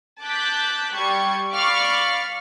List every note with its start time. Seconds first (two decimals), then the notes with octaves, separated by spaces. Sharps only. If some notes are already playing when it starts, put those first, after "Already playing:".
0.22 A5 D6 F#6 G6 B6
0.95 G3 C#6 G#6
1.54 D5 F5 B5 C#6 D6 F6